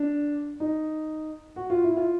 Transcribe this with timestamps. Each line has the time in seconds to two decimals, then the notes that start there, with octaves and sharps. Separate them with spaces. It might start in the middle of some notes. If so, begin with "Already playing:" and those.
Already playing: D4
0.60 D#4
1.56 F#4
1.70 F4
1.84 E4
1.97 F4